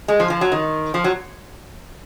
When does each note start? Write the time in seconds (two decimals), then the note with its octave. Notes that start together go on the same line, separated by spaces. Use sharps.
0.08 G#3
0.20 F3
0.30 F3
0.41 F#3
0.52 D#3
0.94 F3
1.04 F#3